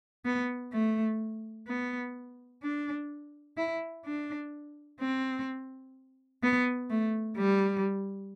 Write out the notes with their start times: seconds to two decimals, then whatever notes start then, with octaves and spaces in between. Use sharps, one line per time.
0.25 B3
0.73 A3
1.68 B3
2.62 D4
3.57 E4
4.05 D4
5.00 C4
6.43 B3
6.90 A3
7.37 G3